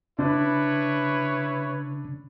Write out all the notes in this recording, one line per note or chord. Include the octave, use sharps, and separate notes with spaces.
C#3 D4 E4 B4 C#5